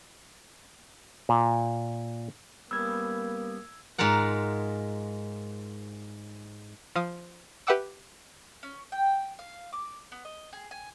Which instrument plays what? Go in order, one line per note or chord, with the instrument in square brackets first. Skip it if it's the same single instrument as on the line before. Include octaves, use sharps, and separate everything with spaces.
[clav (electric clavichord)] A#2
[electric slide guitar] G3 B3 C#4 [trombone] A#3 [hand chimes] E6 G#6
[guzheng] G#2 G#3 F4 A#4 F#5
[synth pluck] F3 F5 D#6
G4 B4 E5 F#5 D6 E6
[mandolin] C#4
G5
F5
D6
B3
D#5
G#4
G#5